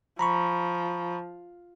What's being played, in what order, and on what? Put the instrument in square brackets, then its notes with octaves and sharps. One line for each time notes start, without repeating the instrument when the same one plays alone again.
[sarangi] F3 [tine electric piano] A#5 B5 C#6